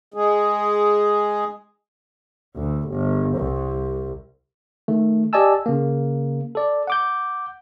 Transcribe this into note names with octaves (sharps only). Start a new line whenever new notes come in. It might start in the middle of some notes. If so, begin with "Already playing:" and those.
G#3 G#4
D2
G1
C2
D#3 A3
G4 D5 D#5 G#5 A5 E6
C#3 A#3
A4 D5
F#5 D6 G6